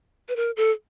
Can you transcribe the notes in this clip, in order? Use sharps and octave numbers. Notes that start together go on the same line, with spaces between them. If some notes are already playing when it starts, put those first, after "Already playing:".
B4
A#4
A4